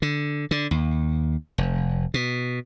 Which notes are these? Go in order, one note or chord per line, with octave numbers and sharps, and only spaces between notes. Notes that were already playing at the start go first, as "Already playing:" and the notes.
D3
D3
D#2
F1
B2